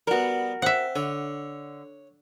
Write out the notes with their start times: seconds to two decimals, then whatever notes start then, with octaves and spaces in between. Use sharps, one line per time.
0.07 G3 B3 F#4 A#4
0.62 C4 E5 F#5
0.95 D3 C#5